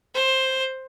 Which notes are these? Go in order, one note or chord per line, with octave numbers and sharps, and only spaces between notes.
C5